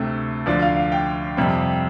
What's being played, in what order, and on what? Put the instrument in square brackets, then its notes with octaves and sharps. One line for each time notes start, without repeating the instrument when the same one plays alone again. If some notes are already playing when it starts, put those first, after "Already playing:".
Already playing: [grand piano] D2 C3 A3 C4
D2 D3 F3 D5
F5
F5
G5
F2 C3 G3 C4